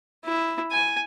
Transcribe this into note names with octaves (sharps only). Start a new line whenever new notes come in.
E4
G#5